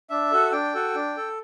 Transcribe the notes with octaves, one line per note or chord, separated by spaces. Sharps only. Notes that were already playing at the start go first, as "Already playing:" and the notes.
D4 E5
F#4 A4
D4 G5
F#4 A4
D4
A4